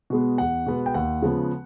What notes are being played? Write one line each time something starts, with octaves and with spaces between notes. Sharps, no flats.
B2 G#3 B3
E2 F#5
B2 G#3 B3
G5
D#2 F#5
C#3 F3 G#3 B3